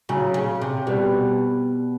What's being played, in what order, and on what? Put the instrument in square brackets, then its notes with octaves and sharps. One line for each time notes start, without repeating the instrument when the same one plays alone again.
[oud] C#3 [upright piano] F#3
[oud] C#3
C3
[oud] B2 [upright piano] G3